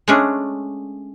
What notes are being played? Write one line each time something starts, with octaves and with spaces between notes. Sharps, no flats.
G#3 A3 C#4 D4 G#4